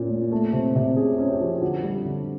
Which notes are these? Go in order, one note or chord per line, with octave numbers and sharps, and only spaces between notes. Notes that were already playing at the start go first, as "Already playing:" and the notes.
Already playing: A#2 C#4
A#3
A3
C3
C3
C#4 G#4
C#4
G4
F3
D3 F#4
G3
D3